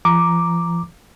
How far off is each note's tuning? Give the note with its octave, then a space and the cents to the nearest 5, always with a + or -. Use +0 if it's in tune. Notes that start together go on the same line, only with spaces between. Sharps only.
F3 -40 A#5 +0 D6 +0